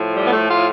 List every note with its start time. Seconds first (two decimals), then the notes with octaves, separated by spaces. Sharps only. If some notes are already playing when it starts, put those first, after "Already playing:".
Already playing: A2 F3
0.15 G3
0.26 B3
0.31 A3
0.49 F4